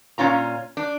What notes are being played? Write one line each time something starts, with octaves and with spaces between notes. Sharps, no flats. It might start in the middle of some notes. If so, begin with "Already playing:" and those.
A#2 C#4 F4 A#5
D4